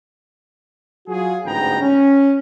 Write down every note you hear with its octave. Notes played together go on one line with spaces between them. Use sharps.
F#3 F4 F#4 G#4
A1 D2 G#2 B3 G5 A#5
C#4